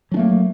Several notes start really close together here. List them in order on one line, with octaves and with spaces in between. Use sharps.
F#3 D4 A3 A#3